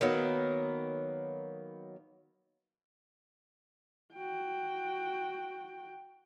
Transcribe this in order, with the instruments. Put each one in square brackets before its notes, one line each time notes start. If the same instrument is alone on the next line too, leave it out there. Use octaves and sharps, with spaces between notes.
[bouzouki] D#3 F#3 A#3 B3
[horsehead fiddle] F#4 G5